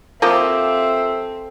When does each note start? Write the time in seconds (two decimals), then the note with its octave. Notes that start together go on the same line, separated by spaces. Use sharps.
0.22 F3 A#3 C4 G4 A4 E5